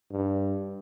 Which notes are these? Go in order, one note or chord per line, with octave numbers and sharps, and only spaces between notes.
G2